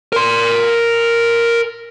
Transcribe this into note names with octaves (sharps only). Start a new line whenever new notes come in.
A#4 C6